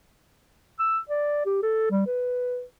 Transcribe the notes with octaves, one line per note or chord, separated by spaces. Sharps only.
E6
D5
G4
A4
G3
B4